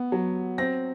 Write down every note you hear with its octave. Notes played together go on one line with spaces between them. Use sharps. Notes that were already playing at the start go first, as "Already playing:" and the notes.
Already playing: B3
F#3
C4 A#6